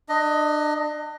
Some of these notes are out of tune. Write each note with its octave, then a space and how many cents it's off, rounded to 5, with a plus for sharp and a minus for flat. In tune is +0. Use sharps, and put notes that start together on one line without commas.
D4 +35 D#5 +10